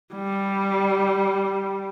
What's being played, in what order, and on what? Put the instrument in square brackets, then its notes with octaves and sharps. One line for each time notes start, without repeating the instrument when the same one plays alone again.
[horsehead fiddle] G3